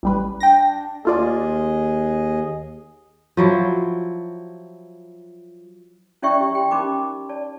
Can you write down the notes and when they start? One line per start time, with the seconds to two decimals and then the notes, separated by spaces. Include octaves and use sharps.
0.03 A1 G3 B4
0.40 D4 G5 A#6
1.05 D#2 A3 F4 G#4 D5 D#5
3.37 F3 F#3 E4
6.22 C#4 E4 D5 E5 G5 C#6
6.41 G4
6.55 G5 C6
6.71 C#4 D#4 A#4 B5 D6
7.29 D5 A5